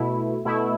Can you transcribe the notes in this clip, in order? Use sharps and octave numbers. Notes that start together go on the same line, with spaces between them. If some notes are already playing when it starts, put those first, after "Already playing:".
Already playing: B2 A3 E4
B2 A3 E4